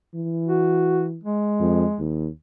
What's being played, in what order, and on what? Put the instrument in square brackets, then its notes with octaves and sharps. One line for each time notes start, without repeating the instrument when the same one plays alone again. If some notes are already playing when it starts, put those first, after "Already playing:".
[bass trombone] E3
[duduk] F#4
G#3
[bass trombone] F2
D#2